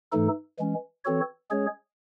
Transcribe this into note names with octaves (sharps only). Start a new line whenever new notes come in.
G#2 E3 A3 D#4 A4
E3 G#3 C#4
E3 C4 F#4 A4 C#5
G#3 C#4 G#4 C#5